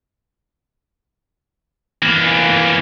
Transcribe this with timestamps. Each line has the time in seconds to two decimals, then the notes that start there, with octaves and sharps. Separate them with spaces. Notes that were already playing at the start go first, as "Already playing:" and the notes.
2.02 E3 A#3